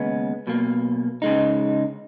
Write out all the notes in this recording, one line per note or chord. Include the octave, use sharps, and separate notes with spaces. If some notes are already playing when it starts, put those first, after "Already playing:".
Already playing: D#2 C#3 G#3 B3
B1 B2 A#3
C#3 G#3 D#4